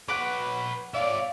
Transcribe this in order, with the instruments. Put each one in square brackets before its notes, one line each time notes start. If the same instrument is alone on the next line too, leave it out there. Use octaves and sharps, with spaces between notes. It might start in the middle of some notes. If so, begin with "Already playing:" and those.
[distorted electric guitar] B4 C#5 [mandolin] F#5 D6
[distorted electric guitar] C#5 E5 [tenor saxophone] D5 [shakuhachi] F5